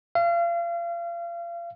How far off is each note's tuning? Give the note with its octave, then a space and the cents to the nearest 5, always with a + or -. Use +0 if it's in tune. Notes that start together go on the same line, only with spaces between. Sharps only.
F5 -35